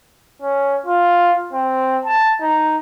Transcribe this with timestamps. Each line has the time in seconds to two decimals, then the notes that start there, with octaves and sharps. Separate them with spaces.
0.42 C#4
0.86 F4
1.53 C4
2.05 A5
2.41 D#4